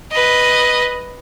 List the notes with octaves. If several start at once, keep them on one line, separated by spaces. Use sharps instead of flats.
B4 D#5